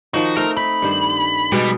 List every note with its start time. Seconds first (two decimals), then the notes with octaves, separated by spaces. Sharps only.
0.14 D#3 F3 D#4 F#4
0.37 A3 C4 D#4 A#4
0.57 D#4 B5
0.82 G2 D#3 C5
1.52 B2 G3 G#3